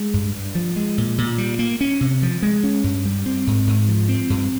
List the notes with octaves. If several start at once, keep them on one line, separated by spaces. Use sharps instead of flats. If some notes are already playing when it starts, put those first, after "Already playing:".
Already playing: G#3
G2
G2
F3
G#3
A#2
A#2
G3
A#3
C#4
C3
F3
G#3
C#4
G2
G3
C4
G#2
G#2
F3
C4
G2